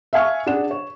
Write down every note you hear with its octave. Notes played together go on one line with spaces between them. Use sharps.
E5 F5 G#5 C#6
D4 G#4 F#5 E7
C#5